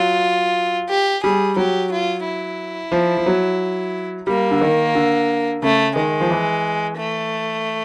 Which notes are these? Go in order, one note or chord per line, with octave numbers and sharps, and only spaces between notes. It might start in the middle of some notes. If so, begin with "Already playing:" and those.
Already playing: F#3 F4
G4
G3 G#4
F#3 G4
F4
E4
F3
F3
F#3
G3 A#3
D3
D#3
D3
C#3 A3
D#3 G#3
F3
E3
A3